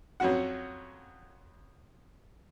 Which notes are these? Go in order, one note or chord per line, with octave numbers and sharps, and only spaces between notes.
F2 F#3 C#4 F#4 F#5